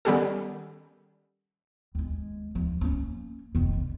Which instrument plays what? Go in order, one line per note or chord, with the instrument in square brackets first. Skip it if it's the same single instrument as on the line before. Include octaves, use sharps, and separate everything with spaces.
[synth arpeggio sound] D#3 G3 B3 C#4 G4 A4
[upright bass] D#2 G#3
D#2 F3
A#3 C#4
F1 D#3
D3